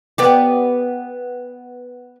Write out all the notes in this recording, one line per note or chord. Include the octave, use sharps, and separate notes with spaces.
B3 G4 D5